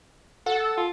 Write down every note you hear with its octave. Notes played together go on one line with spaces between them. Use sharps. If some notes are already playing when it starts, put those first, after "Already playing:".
A4 F#5
F4